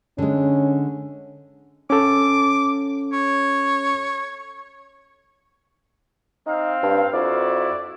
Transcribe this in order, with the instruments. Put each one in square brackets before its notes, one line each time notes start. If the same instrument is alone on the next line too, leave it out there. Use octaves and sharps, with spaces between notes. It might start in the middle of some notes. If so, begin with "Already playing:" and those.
[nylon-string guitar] D3 G#3 [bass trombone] C#4
[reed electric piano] C#4 A4 [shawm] D6
[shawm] C#5
[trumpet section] C4 F5 [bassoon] D#4
[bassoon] G2
[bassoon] F2 [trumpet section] E4 F#4 D5